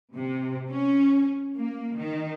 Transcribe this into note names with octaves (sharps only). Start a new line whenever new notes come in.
C3
C#4
A#3
D#3